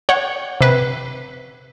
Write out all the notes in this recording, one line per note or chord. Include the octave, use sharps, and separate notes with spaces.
C#5 F#5 G5
C3 B4